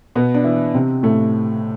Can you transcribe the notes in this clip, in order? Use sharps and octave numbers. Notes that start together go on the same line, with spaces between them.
B2 B3
D4
E3 E4
C3 C4
A2 A3